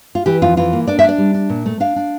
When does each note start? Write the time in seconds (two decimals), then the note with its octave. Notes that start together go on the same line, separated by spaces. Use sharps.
0.15 F4
0.26 E3 G4
0.42 F2 F4
0.57 E3 F4
0.73 A#3
0.87 D4 D5
0.99 D4 E5
1.09 D5
1.18 G3
1.34 D4
1.49 A#2
1.66 A3
1.80 D4 F5
1.96 D4